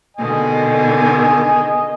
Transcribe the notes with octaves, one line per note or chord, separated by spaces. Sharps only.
B2 D3 D#3 D#5 G#5